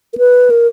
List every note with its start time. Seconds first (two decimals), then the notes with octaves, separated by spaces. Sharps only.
0.13 A#4
0.17 B4
0.50 A#4